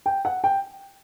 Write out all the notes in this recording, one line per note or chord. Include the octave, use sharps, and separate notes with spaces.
G5
F#5
G5